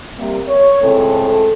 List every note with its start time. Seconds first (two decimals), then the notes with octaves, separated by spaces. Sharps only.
0.19 C3 G3 A#3
0.49 C#5
0.82 C#2 A2 C#3 C4 A4